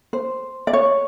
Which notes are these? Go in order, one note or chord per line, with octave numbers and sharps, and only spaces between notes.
C5
D5
C#5